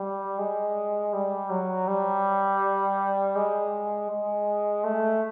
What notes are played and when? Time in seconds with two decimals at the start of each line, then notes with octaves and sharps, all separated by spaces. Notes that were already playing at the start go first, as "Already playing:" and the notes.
Already playing: G3
0.38 G#3
1.13 G3
1.50 F#3
1.87 G3
3.36 G#3
4.10 G#3
4.84 A3